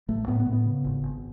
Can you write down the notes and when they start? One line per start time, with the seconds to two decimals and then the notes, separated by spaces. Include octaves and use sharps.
0.08 A1 A3
0.28 A2 B3
0.40 B3
0.46 A2
0.53 B3
0.66 C#3
0.84 G#1
1.03 G#1